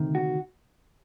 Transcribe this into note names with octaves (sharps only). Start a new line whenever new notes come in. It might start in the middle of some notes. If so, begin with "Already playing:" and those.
Already playing: D2 C3 D#3
F#4